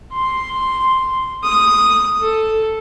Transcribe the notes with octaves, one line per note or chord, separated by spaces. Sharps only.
C6
D#6
A4